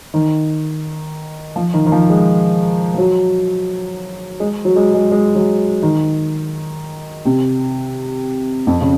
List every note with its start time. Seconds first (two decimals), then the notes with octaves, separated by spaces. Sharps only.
0.14 D#3
1.56 F3
1.74 D#3
1.86 D#3
1.92 F3
2.10 G#3
2.94 F3
2.98 F#3
4.40 G#3
4.65 F#3
4.76 G#3
4.94 G#3
5.12 G#3
5.35 F#3
5.82 D#3
7.25 C3
8.67 F2
8.81 C#3